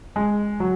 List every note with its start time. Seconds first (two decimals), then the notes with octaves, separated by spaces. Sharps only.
0.16 G#3
0.60 F#3